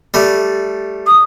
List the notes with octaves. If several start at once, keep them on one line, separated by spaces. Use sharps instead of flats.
G3 A3
D#6